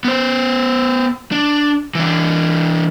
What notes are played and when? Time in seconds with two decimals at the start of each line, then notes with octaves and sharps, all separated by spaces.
0.05 B3 C5
1.32 D4
1.95 E3 D4